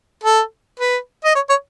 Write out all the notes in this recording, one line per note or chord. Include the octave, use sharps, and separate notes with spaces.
A4
B4
D#5
C#5
C#5